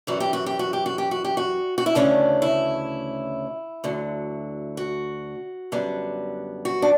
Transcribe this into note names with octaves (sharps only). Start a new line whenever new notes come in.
F#2 E3 G3 F#4
G4
F#4
G4
F#4
G4
F#4
G4
F#4
G4
F#4
F#4
E4
D2 C#3 E3 A3 C#4 D4
E4
D2 D3 F#3
F#4
F#2 D3 G3 B3
F#4
D4